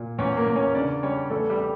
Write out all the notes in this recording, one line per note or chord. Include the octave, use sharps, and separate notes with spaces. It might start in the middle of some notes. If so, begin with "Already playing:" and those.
Already playing: A#2
E2 C#4 C#5
A#3 A#4
E2
C#4 C#5
C#3 D4 D5
G3 C#4 C#5
E2 A3 A4
G3 G4
G3